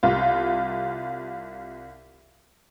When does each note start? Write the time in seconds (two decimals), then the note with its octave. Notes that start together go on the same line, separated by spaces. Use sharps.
0.03 C2 F4